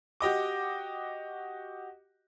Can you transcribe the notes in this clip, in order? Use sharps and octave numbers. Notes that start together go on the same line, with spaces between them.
F#4 G4 D#5 D6